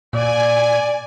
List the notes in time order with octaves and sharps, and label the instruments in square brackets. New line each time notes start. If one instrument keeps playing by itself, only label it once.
[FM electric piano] A#2 [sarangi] D5 [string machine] G#5